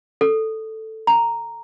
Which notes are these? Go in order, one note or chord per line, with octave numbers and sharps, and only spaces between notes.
A4
A#5